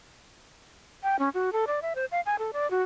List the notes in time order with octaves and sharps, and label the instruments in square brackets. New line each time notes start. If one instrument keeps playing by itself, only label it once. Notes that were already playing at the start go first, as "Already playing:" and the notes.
[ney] G5
C#4
F#4
A4
D5
E5
C5
F5
G#5
A4
D5
F#4